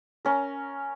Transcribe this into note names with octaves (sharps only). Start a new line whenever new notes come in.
C#4 A#4